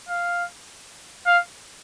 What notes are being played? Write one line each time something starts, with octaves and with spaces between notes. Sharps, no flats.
F5
F5